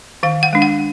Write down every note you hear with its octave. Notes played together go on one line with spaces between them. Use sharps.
D#3 F5
F#5
G#3 D4
F#5